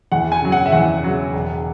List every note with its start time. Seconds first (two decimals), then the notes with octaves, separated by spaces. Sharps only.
0.12 E2 F#5
0.32 G#5
0.42 C#3 F#3
0.52 F#5
0.66 E5
0.72 E2 F#5
1.03 C#3 F#3
1.33 E1